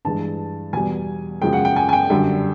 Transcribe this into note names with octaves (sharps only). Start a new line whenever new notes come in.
G2 E3 G#3 A5
E2 B2 G3 G#5
F#2 C#3 F3 G#3 G5
F#5
G5
G#5
G#5
G5
F#2 D3 G3